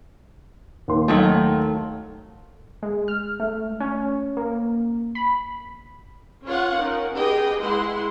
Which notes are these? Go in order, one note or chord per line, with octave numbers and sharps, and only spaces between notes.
D#2 C6
D#3 F#3 A3
G#3
F6
A3
C#4
A#3
B5
C#4 F4 C#5 F5 F#5
C#4 D#4 A#4
G4 G#4 B4 D#5 G5
G#3 E4 F#5 C6